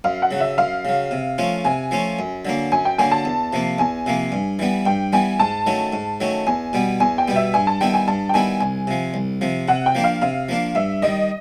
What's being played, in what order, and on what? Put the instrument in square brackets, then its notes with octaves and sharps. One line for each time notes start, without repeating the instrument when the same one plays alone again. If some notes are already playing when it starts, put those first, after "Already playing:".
[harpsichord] F#2 [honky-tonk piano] F5
[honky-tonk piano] F#5
[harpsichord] C#3 F#3
[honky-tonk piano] E5
[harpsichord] F#2 [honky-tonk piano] F5
[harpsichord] C#3 F#3
C3
F3 A3 C#4 F4
[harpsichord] C3 [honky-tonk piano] G#5
[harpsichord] F3 A3 C#4 F4
F#2
D3 F#3 A#3
[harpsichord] F#2 [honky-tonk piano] G#5
[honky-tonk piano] G5
[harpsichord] D3 F#3 A#3 [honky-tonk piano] G#5
[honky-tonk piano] A5
[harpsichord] E2
C3 F3 A#3
[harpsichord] E2 [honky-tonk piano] G#5
[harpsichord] C3 F3 A#3
G2
E3 G3 B3
[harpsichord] G2 [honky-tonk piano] G5
[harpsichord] E3 G3 B3 [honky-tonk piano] G#5
[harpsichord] G#2 [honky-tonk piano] A5
[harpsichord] D#3 F#3 A3 C#4
G#2
D#3 F#3 A3 C#4
[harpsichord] E2 [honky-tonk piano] G#5
[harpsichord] B2 G3 B3
[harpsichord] E2 [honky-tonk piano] G#5
[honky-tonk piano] G5
[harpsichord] B2 G3 B3
[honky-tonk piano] E5
[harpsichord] G2 [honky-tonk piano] G#5
[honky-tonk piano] A5
[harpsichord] D#3 G3 B3 E4 [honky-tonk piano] G5
[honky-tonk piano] G#5
[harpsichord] G2 [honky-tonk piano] A5
[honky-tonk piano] G5
[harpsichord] D#3 G3 B3 E4 [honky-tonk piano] G#5
[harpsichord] C2 [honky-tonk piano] G#5
[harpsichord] C3 F3
C2
C3 F3
[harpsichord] C3 [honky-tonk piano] F#5
[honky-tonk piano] G5
[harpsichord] F3 A#3 D4
[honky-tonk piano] F5
[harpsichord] C3 [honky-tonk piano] F5
[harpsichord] F3 A#3 D4
[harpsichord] G2 [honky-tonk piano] E5
[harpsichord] D#3 G3 [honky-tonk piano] D#5